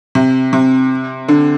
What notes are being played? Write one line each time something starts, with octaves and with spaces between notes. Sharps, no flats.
C3
C3
D3